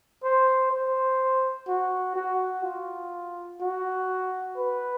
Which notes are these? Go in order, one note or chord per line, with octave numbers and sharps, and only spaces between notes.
C5
C5
F#4
F#4
F4
F#4
B4